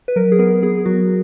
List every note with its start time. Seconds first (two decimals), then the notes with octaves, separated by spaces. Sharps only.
0.08 B4
0.16 F#3 A#4
0.32 G#4
0.39 B3 A#4
0.63 B3 G#4
0.86 F#3 F#4